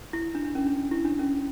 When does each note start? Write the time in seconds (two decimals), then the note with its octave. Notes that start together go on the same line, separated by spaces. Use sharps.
0.13 E4
0.35 D4
0.45 D4
0.55 C#4
0.66 D4
0.91 E4
1.05 D4
1.19 C#4